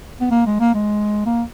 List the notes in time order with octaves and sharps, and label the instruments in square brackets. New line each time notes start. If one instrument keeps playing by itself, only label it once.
[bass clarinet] B3
A#3
G#3
A#3
G#3
A#3